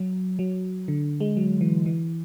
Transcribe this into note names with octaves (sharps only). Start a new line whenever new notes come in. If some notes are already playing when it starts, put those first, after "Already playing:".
Already playing: F#3
F#3
D3
G#3
F#3
E3
E3